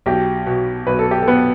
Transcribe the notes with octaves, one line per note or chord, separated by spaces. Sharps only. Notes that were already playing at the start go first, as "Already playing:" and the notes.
B1 G4
B2
B1 B4
A4
G4
A4
B3